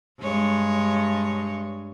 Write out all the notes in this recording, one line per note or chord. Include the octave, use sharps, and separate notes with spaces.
G2 G#3 C#5